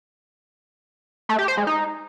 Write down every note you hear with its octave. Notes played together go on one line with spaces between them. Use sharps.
A3
G4
C5
G#3
D#4